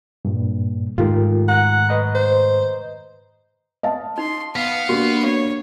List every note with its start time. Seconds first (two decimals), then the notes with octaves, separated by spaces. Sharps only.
0.25 G2 A#2
0.98 G#2 D#3 A3 F4 G4 A#4
1.48 F#5 A#5 F#6
1.89 B4 D#5 A#5
2.15 C5
3.83 D#5 F5 A5
4.18 D#4 C6
4.56 B3 F5
4.89 A#3 D4 F#4 G4
5.24 C#5